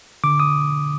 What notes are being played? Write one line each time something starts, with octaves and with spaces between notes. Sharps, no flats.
D3 D6
D#6